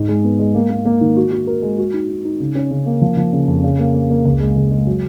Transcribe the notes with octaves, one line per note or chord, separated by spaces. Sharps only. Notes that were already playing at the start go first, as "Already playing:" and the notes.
Already playing: G#2
G#3
B3
G#3
A#3
A#3
A#3
D#3
F#4
F#4
A#4
G#3
F#4
D#4
D#4
D#4
C#3
C#4
C#3
A#3
F3
F3
C#3
F2
C#3
A#3
A#3
A#3
C#2
G#3
C#2
G#3
F#3